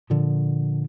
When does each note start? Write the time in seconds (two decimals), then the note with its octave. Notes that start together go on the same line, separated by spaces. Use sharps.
0.10 A#2 D3 F3